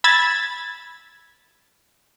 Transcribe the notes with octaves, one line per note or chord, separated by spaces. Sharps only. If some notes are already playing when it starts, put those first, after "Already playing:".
B5 E6 G#6 A6